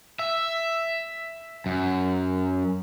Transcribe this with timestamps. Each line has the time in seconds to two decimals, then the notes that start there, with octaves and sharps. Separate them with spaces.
0.19 E5
1.66 F#2